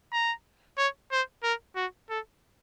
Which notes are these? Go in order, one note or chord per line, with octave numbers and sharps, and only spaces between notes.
A#5
C#5
C5
A#4
F#4
A4